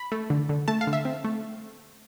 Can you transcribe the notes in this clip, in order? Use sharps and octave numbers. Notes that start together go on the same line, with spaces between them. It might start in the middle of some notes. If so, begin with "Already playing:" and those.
Already playing: B5
A3
D3
D3
A3 A5
F5
D3
E5
C4
A3